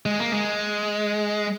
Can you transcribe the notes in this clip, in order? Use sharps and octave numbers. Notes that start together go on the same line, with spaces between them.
G#3
A#3
G#3